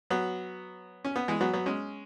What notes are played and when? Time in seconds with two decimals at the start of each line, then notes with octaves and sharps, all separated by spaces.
0.10 F#3 B3
1.05 C#4
1.16 B3
1.28 E3 G#3
1.41 F#3 B3
1.53 F#3 B3
1.66 G#3 C#4